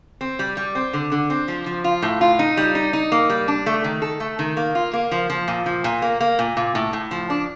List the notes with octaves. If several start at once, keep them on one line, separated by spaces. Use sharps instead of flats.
C4
G3
G3
C4
D3
D3
C4
F3
F3
F4
A2
F4
D#4
G3
D#4
D#4
A#3
G3
D4
A3
D#3
A4
A3
D#3
A#3
F4
A#3
F3
F3
A#2
F3
A#2
A#3
A#3
A#2
A#2
A2
A2
F3
D4